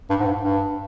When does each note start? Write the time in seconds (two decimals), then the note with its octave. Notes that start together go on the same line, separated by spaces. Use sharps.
0.10 G2
0.20 G#2
0.26 G2
0.41 G2